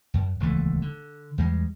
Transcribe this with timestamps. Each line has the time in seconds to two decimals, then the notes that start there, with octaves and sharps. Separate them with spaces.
0.14 F#2
0.40 D#1 C#2 E3 A3
0.82 D3
1.38 E2 G3 G#3